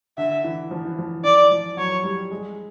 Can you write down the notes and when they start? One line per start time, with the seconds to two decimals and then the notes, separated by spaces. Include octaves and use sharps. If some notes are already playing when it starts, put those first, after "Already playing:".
0.18 D3 E5
0.44 E3
0.71 F3
0.85 E3
0.99 F3
1.24 E3 D5
1.51 F3
1.77 F#3 C#5
2.04 G3
2.31 G#3